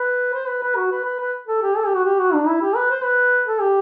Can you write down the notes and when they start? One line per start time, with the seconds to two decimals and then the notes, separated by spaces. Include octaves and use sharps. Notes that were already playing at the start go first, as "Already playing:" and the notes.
Already playing: B4
0.34 C5
0.48 B4
0.63 B4
0.76 F#4
0.91 B4
1.04 B4
1.20 B4
1.47 A4
1.62 G4
1.76 A4
1.86 G4
1.94 F#4
2.05 G4
2.19 F#4
2.33 D4
2.47 E4
2.62 G4
2.75 B4
2.90 C5
3.04 B4
3.47 A4
3.61 G4